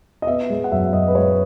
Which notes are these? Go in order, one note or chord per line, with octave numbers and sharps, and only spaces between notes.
D#5
B3 E5
G#3
F#5
F#2 E5
F#2 D#5
B4
G#3 C#5